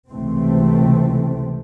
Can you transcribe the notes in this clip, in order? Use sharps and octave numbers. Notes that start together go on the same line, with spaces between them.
C#2 C3 E3 A3 C4